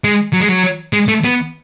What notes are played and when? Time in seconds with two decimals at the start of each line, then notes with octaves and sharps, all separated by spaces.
0.04 G#3
0.33 F#3
0.40 G#3
0.49 F#3
0.93 G#3
1.08 A3
1.24 B3